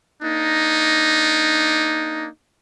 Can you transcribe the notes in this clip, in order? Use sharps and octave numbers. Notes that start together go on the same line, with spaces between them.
A#3 D4 D#4